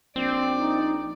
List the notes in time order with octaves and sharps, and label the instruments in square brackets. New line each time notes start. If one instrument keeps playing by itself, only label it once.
[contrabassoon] A#1 [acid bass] C4 [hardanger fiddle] D5
[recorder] D#4